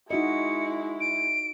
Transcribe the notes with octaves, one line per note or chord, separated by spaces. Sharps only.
G#3 D#4 E4 F#4 D#5 C#7
D7